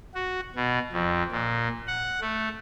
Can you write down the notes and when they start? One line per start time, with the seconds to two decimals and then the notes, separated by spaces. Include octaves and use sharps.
0.14 F#4
0.56 B2
0.92 F2
1.32 A#2
1.87 F#5
2.21 A3